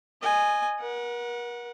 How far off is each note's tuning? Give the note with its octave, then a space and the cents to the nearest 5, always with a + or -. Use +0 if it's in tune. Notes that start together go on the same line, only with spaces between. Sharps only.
D#5 -20 G#5 +0
A#4 +40 F#5 -15